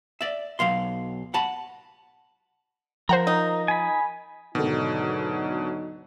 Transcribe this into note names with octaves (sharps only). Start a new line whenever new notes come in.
D5 E5
B1 F#3 F5 C6
F#5 A5 B5
F3 A#4 C5 F#5 A#5
D#4
G#5 B5
D2 G#2 B2 D3 D#3 F#3 D#4